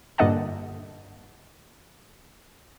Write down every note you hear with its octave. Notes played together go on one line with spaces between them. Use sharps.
G2 A#2 D3 D#5 F#5 A5